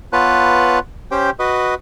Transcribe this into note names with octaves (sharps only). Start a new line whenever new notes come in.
B3 F4 B4 C#5 A5 F#6
C#4 G4 C5 G5
F#4 B4 D#5